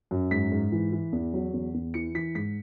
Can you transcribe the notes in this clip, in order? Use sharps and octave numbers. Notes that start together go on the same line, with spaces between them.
F#2
G#2 B6
G#2
E3
E3
E2
F#3
E2
E2
E3 C#7
E3 B6
G#2 B6